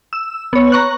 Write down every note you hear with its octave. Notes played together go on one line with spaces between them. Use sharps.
E6
B3 C#5
A#5 C#6 F#6